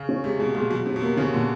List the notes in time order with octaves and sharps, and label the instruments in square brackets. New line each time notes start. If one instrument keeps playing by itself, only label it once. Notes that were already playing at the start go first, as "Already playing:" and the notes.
Already playing: [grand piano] C#3
[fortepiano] C#4
[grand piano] C3 [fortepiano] G#3
[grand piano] B2 [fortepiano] G#3
[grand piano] A#2 [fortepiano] G#3
[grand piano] B2 [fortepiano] F#3
[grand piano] C3 [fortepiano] C#4
[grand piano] B2
[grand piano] C3 [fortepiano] A#3
[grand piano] C#3 [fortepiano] C#4
[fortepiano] A#2 [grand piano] D3